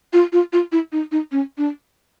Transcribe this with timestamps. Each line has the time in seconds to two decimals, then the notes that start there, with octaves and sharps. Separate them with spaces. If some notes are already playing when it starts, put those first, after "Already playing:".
0.13 F4
0.33 F4
0.53 F4
0.72 E4
0.92 D#4
1.12 D#4
1.32 C#4
1.58 D4